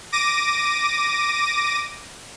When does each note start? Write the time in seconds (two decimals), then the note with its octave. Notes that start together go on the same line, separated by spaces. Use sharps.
0.12 D6 A#6 D#7